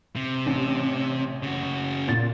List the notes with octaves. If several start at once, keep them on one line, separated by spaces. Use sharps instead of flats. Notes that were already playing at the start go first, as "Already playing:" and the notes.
C3
A1
C#3 F#4
A#2 A6